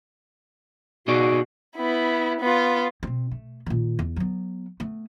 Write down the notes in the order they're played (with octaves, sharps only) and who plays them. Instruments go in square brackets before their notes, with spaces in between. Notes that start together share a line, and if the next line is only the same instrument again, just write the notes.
[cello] B2 [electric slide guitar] D#4 G#4 D5 [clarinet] F#4
[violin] B3 E4
B3 F4
[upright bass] B2 C4
A3
A#2 D#3
E2
F#3 B3
A3 B3